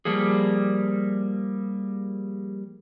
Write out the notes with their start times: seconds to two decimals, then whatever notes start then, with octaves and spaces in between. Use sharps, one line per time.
0.05 F3 G3 A#3 G#4